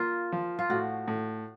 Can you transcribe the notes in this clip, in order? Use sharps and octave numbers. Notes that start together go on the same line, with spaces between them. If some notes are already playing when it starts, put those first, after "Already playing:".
Already playing: A#3 F4
F3
F4
A2 F#4
A2